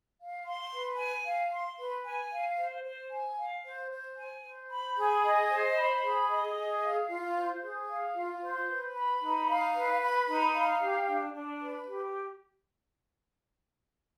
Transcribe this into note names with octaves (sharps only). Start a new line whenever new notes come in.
F5
C6
B4
G#5
F5
C6
B4
G#5
F5
C5
C5
G#5
F5
C5
C5
G#5
C5
B5
G#4
D#5
C5
B5
G#4
D#5
G#4
F5
F4
C5
G#4
F5
F4
C5
B4
B5
D#4
F5
B4
B5
D#4
F5
G4
D4
D4
B4
G4